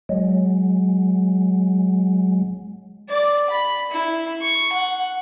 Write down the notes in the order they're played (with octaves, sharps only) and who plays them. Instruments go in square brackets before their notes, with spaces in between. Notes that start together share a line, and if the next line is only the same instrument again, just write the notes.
[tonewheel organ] F#3 G#3
[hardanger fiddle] D5
B5
E4
C#6
F#5